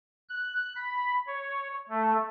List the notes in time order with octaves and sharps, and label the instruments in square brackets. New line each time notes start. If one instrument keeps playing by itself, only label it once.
[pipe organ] F#6
B5
C#5
A3